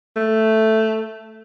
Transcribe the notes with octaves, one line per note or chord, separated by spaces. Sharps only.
A3